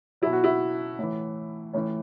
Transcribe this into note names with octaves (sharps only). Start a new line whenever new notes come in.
B2 F#3 E4
F#4
E4
A2 E3
A2 E3 C#4